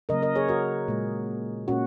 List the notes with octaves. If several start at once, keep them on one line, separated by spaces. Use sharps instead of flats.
C#3 F#3 A#3 A#4 D#5
A#4 D#5
G#4 C#5
F#4 A#4
A#2 G#3
A#2 A#3 C#4 F#4